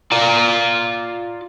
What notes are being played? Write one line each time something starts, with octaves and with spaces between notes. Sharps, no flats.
F4 D5 F5 A#5